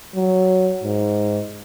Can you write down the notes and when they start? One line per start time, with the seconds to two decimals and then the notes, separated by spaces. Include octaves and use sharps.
0.15 F#3
0.83 G#2